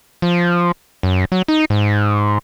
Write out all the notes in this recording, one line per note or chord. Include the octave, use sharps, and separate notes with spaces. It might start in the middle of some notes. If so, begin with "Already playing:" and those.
F3
F#2
F#3
D#4
G#2